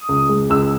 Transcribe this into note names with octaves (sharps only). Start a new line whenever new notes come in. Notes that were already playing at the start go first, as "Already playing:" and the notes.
Already playing: D#6
C#2
G#3
C#2 E6